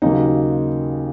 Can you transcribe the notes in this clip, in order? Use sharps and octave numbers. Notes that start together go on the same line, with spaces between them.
D#2 C#3 F#3 A#3 D#4